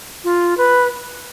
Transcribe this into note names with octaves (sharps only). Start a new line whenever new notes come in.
F4
B4